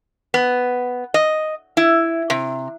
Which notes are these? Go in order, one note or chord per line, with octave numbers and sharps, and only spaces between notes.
B3
D#5
E4
C3